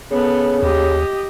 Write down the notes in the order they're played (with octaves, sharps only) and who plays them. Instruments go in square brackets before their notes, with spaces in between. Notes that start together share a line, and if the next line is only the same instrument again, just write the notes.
[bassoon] C#3 [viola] B3 A4
[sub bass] D#2 [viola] G4 D#5